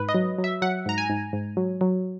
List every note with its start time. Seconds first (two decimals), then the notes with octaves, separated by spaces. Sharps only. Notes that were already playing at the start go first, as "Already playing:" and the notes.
Already playing: G#2 B4
0.09 D#5
0.14 F#3
0.38 F#3
0.44 E5
0.62 F#3 F#5
0.86 G#2 A#5
0.98 G#5
1.10 G#2
1.33 G#2
1.57 F#3
1.81 F#3